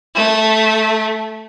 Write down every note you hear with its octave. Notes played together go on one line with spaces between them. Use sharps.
A3